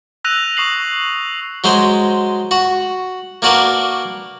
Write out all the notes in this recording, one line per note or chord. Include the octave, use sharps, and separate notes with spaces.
E6 F#6 A#6 D#7 F7
C#6 D#6 C7 F#7
F#3 G#3 C5 D#5
F#4
A#3 D4 F#4 A#4 B4